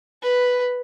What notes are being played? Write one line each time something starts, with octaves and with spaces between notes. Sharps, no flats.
B4